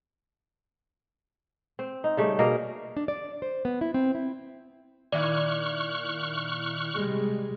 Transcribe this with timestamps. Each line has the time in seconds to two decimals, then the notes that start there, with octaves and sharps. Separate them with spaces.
1.79 C4
2.04 D#4
2.17 C#3 G3 A3
2.39 B2 A#3 G#4 A#4
2.97 D4
3.08 D5
3.42 C5
3.65 B3
3.81 E4
3.94 C4
4.15 E4
5.12 A#2 D#3 E4 D5 C#6 F6 F#6
6.96 C3 G3 G#3